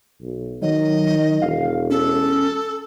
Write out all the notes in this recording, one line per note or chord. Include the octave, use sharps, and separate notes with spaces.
B1
D#3 F#3 D#5
E1 F5
C#4 A4